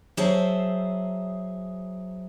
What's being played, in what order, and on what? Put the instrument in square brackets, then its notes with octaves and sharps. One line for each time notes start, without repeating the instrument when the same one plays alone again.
[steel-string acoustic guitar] F#3 G#4 C5 E5 A5